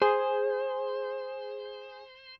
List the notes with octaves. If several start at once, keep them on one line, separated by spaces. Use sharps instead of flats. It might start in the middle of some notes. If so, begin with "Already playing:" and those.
G#4 C5